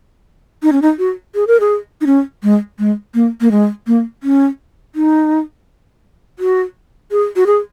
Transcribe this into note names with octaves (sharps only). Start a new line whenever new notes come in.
D#4
C#4
D#4
F#4
G#4
A#4
G#4
D#4
C#4
G#3
G#3
A#3
A#3
G#3
A#3
C#4
D#4
F#4
G#4
F#4
G#4